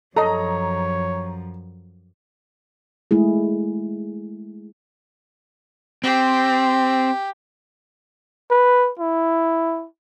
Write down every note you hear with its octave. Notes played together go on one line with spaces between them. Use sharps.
F#2 F3 A4 C#5 D#5 A#5
G#3 A3 E4 G#4
C4 G4
B4
E4